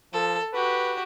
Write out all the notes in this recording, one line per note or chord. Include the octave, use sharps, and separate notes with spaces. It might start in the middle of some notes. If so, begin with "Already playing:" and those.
F3 A4
F#4 G4 B4